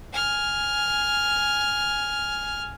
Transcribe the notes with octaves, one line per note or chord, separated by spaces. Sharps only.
G#5 F6